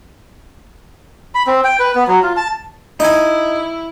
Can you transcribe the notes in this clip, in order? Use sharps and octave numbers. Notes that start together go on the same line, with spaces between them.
B5
C4
G5
B4
B3
F#3
F4
A5
D#4 E4 G#5